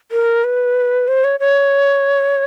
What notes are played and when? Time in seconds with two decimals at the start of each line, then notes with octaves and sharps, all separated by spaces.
0.12 A#4
0.44 B4
1.08 C5
1.24 C#5
1.40 C#5